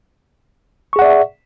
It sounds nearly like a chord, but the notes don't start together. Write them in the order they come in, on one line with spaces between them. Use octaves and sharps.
C#6 G#4 F#5 D5 E5